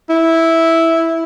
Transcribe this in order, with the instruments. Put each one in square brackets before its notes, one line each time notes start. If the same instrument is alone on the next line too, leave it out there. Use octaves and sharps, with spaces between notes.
[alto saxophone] E4